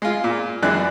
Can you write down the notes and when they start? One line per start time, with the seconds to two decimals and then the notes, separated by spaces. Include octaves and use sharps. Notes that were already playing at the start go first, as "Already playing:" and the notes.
0.02 G#3 F4
0.24 A#2
0.63 F#2 E3 G#3 D4 F#6